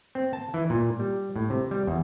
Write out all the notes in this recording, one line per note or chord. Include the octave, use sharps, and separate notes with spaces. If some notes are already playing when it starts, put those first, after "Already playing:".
C4
A5
E3
A#2
G3
A2
C3
G3
E2